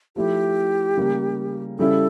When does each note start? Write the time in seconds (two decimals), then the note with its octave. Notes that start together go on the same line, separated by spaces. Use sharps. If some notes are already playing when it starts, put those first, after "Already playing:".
0.16 F3 A3 E4 G4
0.97 C#3 G3 A#3
1.79 C#3 G3 C#4 E4 A4